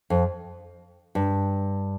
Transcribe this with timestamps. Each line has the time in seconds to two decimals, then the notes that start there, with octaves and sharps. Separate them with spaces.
0.10 F2
1.15 G2